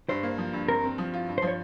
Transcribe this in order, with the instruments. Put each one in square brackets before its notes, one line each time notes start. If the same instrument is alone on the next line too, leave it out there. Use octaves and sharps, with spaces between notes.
[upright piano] G2 [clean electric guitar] C5
[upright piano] A#3
F3
G2
[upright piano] C4 [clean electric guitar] A#4
[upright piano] C4
F3
F4
G2
[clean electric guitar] C5
[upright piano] F3
[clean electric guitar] C#5